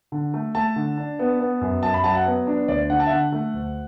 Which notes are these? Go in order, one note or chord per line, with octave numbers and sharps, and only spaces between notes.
D3
A3
A3 A5
D3
D4
B3
B3
F#2
F#2 A5
B5
F#3 A5
F#5
B3
D4
D2 D5
D3 F#5
A5
E5
D3 F#5
A3
D2